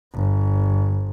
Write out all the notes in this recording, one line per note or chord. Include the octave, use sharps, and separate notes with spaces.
G1